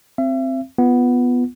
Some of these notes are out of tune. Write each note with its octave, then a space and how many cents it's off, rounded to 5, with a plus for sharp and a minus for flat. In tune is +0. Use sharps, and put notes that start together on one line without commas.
C4 +0 E5 +40
B3 +0 F4 +0 F#5 +0